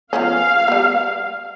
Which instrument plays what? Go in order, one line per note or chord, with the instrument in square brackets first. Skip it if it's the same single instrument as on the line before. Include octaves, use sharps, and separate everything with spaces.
[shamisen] F3 B3 C#4 [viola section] F5
[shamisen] G3 B3